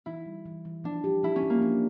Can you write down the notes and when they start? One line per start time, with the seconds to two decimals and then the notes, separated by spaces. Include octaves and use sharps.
0.06 E3 E4
0.26 G3
0.46 E3
0.65 E3
0.84 F3 D4
1.04 G4
1.23 F3 E4
1.36 C#4
1.43 F3
1.50 A#3
1.62 D4